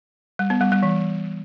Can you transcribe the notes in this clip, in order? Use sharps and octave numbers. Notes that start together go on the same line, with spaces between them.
G3
B3
G3
G3
E3